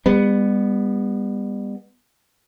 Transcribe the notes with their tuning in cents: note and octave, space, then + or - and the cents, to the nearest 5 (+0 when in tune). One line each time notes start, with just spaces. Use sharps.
G3 +40 B3 +0